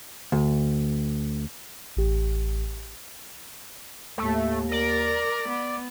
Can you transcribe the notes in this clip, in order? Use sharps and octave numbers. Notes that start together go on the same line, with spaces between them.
D2
A1 G4
D#2 A2 A3
A#4 D5
B3